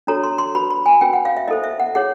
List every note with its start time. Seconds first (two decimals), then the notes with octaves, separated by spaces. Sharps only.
0.07 D4 F#4 A4 C#5 A#5
0.23 C6
0.38 C6
0.55 F#4 B4 B5
0.71 B5
0.86 G#5
1.01 C#4 F#4 B4 G5
1.13 F#5
1.25 F5
1.37 E5
1.48 E4 A4 C5 D#5
1.64 E5
1.80 F#5
1.95 E4 G#4 C#5 F#5